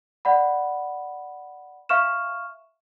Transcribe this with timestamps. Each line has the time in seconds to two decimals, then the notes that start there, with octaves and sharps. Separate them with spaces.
0.25 D5 F#5 B5
1.89 E5 F5 C#6 F6 E7